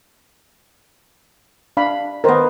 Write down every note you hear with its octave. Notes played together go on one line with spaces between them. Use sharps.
D4 F5 B5
D#3 B3 A#4 C5